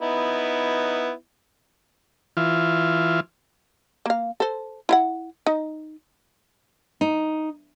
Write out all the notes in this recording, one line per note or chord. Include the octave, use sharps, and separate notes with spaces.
B3 D#4 E4
E3 F4
A#3 F5
A4 C5
E4 F5 F#5
D#4
D#4